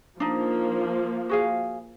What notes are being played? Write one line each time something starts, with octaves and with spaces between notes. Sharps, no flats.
F3 A#3 D4 D#4
F#4 G#4 F5